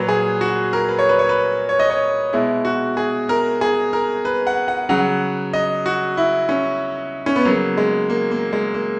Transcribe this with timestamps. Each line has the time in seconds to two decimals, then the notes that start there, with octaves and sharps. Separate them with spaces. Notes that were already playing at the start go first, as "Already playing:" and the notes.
Already playing: A#2 F#3 B4
0.09 G#4
0.41 F#4
0.73 A#4
0.89 B4
0.98 C#5
1.09 B4
1.19 C#5
1.29 B4
1.69 C#5
1.79 D#5
1.90 C#5
2.33 B2 G#3 E4
2.65 F#4
2.97 G#4
3.29 A#4
3.61 G#4
3.93 A#4
4.25 B4
4.47 F#5
4.68 F#5
4.89 C#3 F#3 F#5
5.53 D#5
5.86 F#4
6.17 E4
6.49 C#4
7.26 C#4
7.36 B3
7.45 C#3 F#3 A#3
7.77 G#3
8.10 A#3
8.31 A#3
8.53 G#3
8.74 A#3